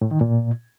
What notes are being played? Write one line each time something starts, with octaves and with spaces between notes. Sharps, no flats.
A2
D#3
A#2